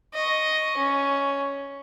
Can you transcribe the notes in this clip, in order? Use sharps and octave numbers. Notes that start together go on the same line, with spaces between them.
D#5 C#6
C#4